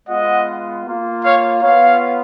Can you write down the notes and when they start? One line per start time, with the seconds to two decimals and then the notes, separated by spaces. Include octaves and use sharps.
0.08 G#3 B3 F4 D#5 F#5
0.86 A#3 F4
1.24 C#5 F5
1.63 B3 F4 C#5 F5